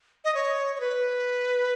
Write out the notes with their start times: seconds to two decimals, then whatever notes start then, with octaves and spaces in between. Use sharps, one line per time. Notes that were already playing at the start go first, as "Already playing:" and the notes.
0.25 D#5
0.35 C#5
0.75 C#5
0.80 B4